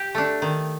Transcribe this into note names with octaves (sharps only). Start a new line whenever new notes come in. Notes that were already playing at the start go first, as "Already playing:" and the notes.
Already playing: G4
A3 D4
D#3